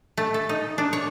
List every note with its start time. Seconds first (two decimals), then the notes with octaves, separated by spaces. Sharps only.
0.17 A3
0.34 A4
0.49 D#4
0.78 D4
0.93 C#5